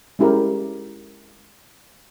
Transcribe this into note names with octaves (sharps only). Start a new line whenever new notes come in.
G#3 C#4 E4 G4 A#4